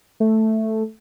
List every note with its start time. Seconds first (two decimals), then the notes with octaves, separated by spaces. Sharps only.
0.20 A3